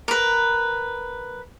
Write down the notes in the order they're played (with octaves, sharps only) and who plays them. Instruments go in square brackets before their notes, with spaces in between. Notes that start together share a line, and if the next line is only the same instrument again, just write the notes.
[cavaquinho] A#4 B4